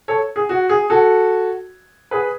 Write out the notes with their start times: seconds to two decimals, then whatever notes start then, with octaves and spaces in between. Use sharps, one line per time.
0.08 A4 C#5
0.36 G#4
0.49 F#4
0.69 G#4
0.90 F#4 A4
2.11 G#4 B4